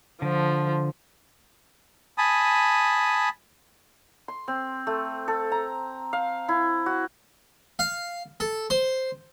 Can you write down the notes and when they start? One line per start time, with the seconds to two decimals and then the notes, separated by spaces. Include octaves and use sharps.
0.22 D3 F3
2.18 G#5 A5 B5 D#6
4.28 C6
4.48 C4
4.87 A3
5.28 A4
5.52 A#5
6.13 F5
6.49 E4
6.86 F#4
7.79 F5
8.40 A4
8.70 C5